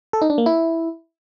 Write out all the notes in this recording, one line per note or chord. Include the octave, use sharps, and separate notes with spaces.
A4
D#4
D4
A#3
E4